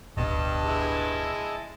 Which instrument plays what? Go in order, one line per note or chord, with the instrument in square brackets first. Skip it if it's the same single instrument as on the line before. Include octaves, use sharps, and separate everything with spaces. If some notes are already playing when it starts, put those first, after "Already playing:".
[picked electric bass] D1 G1 B2 [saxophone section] G2 [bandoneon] D#5 A5
[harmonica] G#3 E4